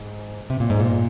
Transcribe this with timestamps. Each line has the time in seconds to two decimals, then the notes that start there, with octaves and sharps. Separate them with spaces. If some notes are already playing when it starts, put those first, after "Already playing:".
Already playing: G#2
0.50 C3
0.60 A#2
0.70 G#2
0.80 A#2